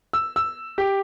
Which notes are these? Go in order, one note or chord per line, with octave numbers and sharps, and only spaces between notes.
E6
E6
G4